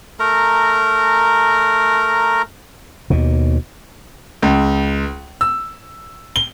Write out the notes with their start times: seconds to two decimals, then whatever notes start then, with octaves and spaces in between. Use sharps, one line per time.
0.20 A3 A#4 A#5
3.10 D#2 B2
4.42 C#2
5.41 E6
6.36 G7